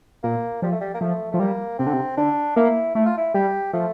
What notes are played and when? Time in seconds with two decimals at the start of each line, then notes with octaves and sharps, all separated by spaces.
0.23 A#2 A#3
0.62 F3 G3
0.72 A3
0.81 G3
0.94 A#3
1.01 F3 A3
1.32 F3 A3
1.40 G3 A#3
1.79 C3 C4
1.87 D3
1.93 C3
2.17 D3 D4
2.56 A#3 E4
2.95 A3 E4
3.06 F4
3.18 E4
3.34 G3 G4
3.73 F3 A3